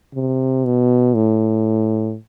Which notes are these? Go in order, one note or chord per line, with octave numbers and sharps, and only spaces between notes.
C3
B2
A2